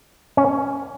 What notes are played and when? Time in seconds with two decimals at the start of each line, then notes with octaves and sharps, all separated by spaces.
0.37 C#4